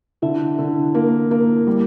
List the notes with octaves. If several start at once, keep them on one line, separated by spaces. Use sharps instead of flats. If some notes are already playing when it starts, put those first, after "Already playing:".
D3 E4
D3
A#3
A#3
G3